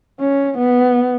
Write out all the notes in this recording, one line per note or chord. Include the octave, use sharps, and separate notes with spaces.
C#4
B3